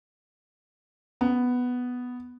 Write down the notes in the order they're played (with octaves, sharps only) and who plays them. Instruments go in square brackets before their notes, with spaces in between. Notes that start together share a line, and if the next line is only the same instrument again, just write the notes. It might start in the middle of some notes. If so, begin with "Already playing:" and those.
[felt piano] B3